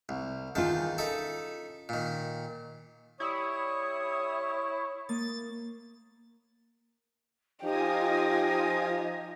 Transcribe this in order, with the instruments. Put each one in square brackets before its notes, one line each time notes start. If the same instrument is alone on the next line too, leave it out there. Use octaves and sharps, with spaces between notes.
[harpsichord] C2
[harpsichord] E2 D#3 A5 [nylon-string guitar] C#4 F4
[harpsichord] D#4 A4 E5
A#2 D#3
[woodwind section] G3 C#6 D#6 [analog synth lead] E4 [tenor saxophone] C#5
[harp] A#3 D#6 [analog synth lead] A6
[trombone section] F3 D#4 [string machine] F4 G#5 D#6 [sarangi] G4 [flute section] D#5